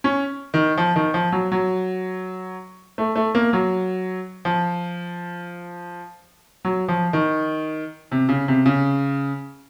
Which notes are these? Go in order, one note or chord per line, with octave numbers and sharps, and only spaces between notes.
C#4
D#3
F3
D#3
F3
F#3
F#3
A3
A3
A#3
F#3
F3
F#3
F3
D#3
C3
C#3
C3
C#3